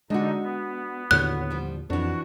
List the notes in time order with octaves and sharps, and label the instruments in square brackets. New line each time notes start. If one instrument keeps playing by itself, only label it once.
[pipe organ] D3 D#4 D#5 [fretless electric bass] G#3 [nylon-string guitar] D4 F#4
[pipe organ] B3
[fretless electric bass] D#2 A2 D3 [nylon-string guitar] F#4 C#5 [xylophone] F#6
[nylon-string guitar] F3 G3
[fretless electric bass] F2 [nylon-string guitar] E3 D4 [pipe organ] F#4